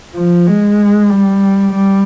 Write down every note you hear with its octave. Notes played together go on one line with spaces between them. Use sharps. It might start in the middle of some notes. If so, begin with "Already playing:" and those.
F3
G#3
G3
G3